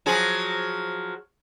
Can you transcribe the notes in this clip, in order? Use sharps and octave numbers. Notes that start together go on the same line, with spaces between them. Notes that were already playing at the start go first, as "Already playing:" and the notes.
F3 F#3 G#4